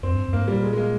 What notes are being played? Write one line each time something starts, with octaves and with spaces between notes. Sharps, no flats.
F2 C4
G2
F2
G2 A#3
G#2
A#2 G3
G#3
G#3
A#3